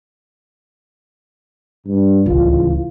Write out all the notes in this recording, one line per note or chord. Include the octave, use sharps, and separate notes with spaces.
G2
D1 C#2 C#3 E3 F4